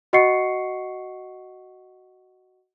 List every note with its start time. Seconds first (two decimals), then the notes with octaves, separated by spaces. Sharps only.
0.13 F#4 D#5 F#5 C#6 C7 C#7